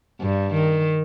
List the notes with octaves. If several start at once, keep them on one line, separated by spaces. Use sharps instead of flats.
G2
D#3